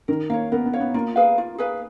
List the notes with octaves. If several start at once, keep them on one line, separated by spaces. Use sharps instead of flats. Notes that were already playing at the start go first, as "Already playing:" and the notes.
D#3 A#4
A#3 C#5 F5
B3 A#4
B3
C#5 F5
B3
A#3 F4
G#4 B4 F5
F4
G#4 B4 F5